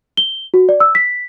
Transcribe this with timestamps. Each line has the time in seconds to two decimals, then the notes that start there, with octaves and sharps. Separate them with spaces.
0.17 G7
0.54 F#4
0.69 D5
0.80 E6
0.95 B6